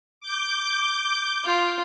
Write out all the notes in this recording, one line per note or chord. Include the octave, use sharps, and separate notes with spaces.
D6 G6
F4